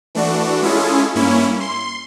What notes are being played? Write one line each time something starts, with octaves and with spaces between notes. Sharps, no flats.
E3 A3 D4 F#4
G#3 C#4 E4 F4 G#4 A4
G2 A#3 C#4 E4
C6